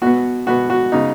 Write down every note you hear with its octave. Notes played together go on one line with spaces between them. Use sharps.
B2 B3 F#4
B2 B3 F#4
F#4
C#3 B3 D#4